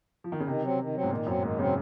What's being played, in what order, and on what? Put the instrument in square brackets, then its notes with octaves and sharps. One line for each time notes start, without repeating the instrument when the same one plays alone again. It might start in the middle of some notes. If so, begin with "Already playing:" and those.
[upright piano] F3
D#3
C#3
[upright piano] C3 [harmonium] D#3
[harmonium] F#3 C4
D#3
F#3 C4
[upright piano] G#2
[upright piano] A#2 [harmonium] D#3
[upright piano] F#2 [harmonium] F#3 C4
[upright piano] G#2 [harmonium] D#3
[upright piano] C#3 [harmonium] F#3 C4